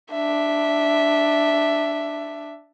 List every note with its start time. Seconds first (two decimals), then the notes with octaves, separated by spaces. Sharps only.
0.11 D4 E5